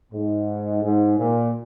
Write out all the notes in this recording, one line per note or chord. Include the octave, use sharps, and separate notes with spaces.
G#2
G#2
A#2